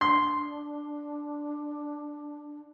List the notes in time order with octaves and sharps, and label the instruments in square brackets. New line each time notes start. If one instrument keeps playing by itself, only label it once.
[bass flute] D4 [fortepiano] C6